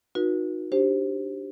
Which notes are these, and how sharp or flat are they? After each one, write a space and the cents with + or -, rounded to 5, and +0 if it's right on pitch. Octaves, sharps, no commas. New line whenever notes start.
D#4 +0 F#4 -30 B4 -45
D4 +0 G4 +0 C5 +15